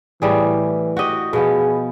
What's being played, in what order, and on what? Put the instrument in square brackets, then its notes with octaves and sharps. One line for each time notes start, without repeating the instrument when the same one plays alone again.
[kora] A2 G3 G#4 [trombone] E3
[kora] F#4 G4 D#5
[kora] B2 F3 B3 [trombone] G#4